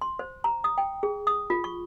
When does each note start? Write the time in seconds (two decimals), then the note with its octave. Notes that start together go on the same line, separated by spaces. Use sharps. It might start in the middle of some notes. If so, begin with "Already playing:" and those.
0.02 C6
0.19 C5
0.44 A#5
0.64 D#6
0.78 G5
1.03 G#4
1.27 D#6
1.50 F4
1.64 C#6